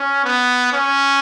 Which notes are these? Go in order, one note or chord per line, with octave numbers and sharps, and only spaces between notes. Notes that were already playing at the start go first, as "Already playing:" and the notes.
Already playing: C#4
B3
C#4